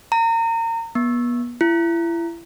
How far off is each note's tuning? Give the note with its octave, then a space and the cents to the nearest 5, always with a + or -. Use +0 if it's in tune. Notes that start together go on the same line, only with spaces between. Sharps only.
A#5 -30
B3 -35
E4 +30